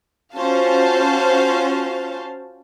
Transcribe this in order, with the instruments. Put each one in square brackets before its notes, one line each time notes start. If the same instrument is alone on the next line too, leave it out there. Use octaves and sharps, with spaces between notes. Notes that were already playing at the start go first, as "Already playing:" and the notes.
[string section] C#4 F4 F#4 C5 F5 A5